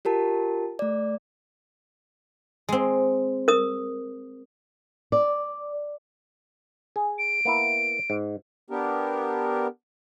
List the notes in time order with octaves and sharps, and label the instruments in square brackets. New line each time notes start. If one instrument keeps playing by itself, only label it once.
[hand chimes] F4 G4 A#4 A5
A3 D5
[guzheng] G#3 C4
[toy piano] A#4 D#6
[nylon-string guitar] D5
[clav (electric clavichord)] G#4
[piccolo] D7
[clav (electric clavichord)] A#3 B3 E4
G#2
[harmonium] B3 D4 G4 A#4